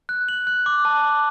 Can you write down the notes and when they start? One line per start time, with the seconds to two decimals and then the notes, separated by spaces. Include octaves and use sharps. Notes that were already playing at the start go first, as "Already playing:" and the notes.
0.09 F#6
0.29 F#7
0.47 F#6
0.66 D6
0.85 A5
1.03 D6